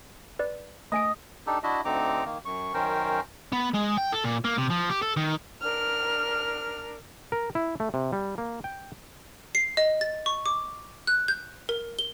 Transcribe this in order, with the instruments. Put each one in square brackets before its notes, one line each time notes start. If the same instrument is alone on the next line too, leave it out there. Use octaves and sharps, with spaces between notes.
[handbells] B4 D5
[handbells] A3 G#5 D7 [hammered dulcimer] D#5
[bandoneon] D4 D#4 G4 A4
D4 E4 F#4 D#5 E5
D2 D3 C4 D#4 A#5 D6
D#3 A#3
F#2 C#6
F#2 D#3 C#4 A#4 C5 G5
[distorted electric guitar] B3
G#3
G5
A4
A#2
A#3
C3
F3
G4
A4
D#3
[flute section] D4 A#4 [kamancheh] F6
[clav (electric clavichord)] A#4
E4
A3
C3
G3
A#3
G5
[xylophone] C7
D#5
A6
C#6
D6
F#6
G6
A#4
G7